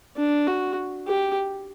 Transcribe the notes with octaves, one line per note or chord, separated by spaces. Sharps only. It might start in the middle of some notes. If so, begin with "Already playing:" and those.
D4
F#4
G4